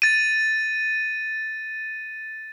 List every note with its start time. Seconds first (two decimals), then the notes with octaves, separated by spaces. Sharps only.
0.02 A6 D#7